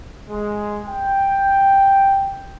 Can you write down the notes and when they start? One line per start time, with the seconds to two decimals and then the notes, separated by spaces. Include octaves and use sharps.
0.29 G#3
0.86 G5